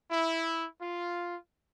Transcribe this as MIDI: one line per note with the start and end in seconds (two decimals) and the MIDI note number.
0.11 0.66 64
0.81 1.36 65